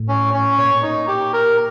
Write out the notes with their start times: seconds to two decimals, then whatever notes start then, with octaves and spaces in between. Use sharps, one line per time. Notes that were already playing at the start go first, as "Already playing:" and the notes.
Already playing: A2
0.08 C#4
0.34 C#4
0.58 A#2 C#5
0.82 D#4
1.08 G4
1.33 A#4